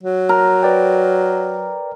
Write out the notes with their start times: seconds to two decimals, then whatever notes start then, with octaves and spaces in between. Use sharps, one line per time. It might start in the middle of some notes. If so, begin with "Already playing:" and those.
0.03 F#3
0.29 A#4
0.63 B4 D5 G5